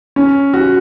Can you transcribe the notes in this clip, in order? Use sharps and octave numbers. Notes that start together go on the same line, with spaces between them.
C#4
F#4